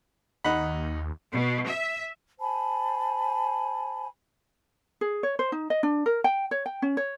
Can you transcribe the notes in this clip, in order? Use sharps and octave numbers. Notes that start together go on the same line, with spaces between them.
D#2 D#4 F#5 B5
B2
E5
C5 G#5 A5 B5
G#4
C#5
C5
D#4
D#5
D4
A#4
G5
C#5
G5
C#4
C#5